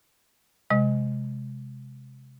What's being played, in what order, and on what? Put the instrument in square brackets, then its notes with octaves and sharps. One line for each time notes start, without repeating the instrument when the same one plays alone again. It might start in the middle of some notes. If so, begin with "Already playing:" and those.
[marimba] C3 G#3 D#5